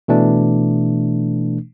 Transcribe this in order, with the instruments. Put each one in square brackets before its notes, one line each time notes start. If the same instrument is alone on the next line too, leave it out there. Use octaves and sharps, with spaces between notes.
[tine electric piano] B2 E3 A3 D4